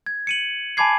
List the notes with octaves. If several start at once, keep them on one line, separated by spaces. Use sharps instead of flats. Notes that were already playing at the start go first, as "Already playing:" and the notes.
G#6
C#7 D#7 F#7
G#5 A5 B5 D6 G#6 C7